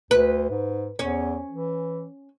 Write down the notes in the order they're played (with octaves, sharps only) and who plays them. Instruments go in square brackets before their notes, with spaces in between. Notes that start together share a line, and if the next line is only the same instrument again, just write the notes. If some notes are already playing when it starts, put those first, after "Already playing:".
[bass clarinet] D2 [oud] B4
[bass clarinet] G#2
[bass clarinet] E2 [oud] C#4
[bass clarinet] E3